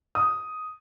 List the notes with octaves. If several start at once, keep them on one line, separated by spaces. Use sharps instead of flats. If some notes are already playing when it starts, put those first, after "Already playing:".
D#6